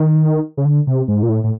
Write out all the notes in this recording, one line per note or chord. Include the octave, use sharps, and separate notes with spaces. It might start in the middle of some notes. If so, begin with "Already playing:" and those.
Already playing: D#3
C#3
D3
C3
G#2
A#2
A2
A2